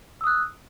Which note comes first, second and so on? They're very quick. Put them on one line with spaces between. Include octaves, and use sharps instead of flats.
E6 D#6 F#6